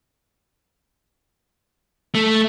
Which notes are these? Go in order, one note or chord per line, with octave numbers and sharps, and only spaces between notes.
A3